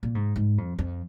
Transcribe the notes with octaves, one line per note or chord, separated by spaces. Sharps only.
A#2
G#2
G#2
F2
F2